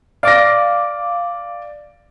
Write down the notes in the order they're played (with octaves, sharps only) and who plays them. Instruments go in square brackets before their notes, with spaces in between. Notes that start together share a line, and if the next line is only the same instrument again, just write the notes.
[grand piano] D5 A#6 [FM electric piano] F5 D6